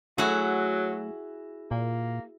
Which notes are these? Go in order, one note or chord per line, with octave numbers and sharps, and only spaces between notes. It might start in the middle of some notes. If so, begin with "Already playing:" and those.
F#3 A3 E4 F#4 G#4
A#2 A#3